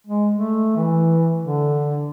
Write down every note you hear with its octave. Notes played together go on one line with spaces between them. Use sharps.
G#3
A3
E3
D3